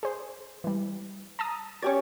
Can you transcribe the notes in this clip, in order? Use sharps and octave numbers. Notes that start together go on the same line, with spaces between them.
G#4 C5
E3 G3
A5 A#5 D#6
C#4 G4 D5 C#6 G#6